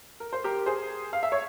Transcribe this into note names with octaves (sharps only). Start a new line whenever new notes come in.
A#4
C5
G4 A#4
G#4 C5
F5
E5
C#5